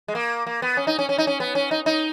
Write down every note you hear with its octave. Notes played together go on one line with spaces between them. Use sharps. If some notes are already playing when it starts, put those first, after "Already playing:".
G#3
A#3
A#3
B3
C#4
D#4
C#4
C#4
D#4
C#4
B3
C#4
D#4
D#4